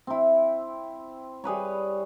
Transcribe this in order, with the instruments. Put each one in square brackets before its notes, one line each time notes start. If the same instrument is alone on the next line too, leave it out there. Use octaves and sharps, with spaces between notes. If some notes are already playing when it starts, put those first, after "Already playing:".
[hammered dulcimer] C4 E4
G3 G#4 B4 C#5